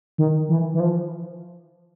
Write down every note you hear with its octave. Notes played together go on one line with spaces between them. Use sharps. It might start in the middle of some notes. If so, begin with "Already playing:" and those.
D#3
E3
E3
F3